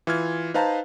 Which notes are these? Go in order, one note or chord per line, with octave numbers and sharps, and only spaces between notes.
E3 F4 F6 G#6
D#4 B4 C5 F5 A5 A#5